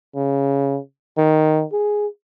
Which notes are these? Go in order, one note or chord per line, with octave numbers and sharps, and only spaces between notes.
C#3
D#3
G#4